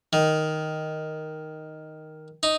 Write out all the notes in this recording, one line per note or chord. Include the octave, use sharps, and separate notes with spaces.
D#3
D#4